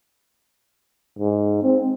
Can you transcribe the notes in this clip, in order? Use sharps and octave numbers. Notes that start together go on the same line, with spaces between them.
G#2
C4